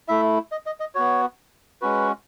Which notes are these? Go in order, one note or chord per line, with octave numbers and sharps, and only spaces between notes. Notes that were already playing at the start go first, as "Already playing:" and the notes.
A3 E4 E5
D#5
D#5
D#5
B3 F#4 C#5
G#3 C#4 F#4 B4